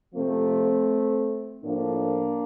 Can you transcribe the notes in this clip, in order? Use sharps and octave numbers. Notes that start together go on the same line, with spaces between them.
C3 F3 A3 C4
A2 F3 A#3 D4